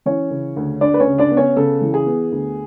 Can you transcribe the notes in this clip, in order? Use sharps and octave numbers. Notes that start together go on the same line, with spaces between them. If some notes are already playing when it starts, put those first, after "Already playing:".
E3 C#4 C#5
C#3
D2
D2 D4 D5
B4
C#4 C#5
C#3
D4 D5
B3
C#4 C#5
C#3 A4
E3
G#4
B3
D2